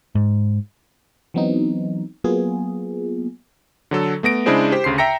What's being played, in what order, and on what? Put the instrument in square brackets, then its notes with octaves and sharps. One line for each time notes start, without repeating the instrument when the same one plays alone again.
[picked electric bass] G#2
[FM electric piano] E3 F#3 B3 C4 D#4
F#3 A#3 B3 F4 G#4
[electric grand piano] D3 F#3 A4
A3 B3 A#6 D7
C#3 G#3 D4 E4 G#4 C5
G4 C5 B6
D2 C#3 C6 C7
E5 G5 A#5 A#6 C#7